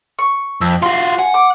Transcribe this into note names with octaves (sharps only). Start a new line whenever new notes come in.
C#6
F2 E6
F4 F#4 C6
F#5 G#5
D6